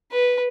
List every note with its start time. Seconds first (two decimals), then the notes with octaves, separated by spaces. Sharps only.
0.12 B4